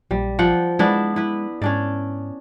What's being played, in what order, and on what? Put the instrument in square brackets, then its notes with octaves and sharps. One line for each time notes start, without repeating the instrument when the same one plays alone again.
[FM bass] A#1 [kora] G3
[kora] F3 F#5 G5
[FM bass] G#3 [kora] B3 D4 E4
[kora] E4 B4
[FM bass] G#2 [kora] C#4 D4 D5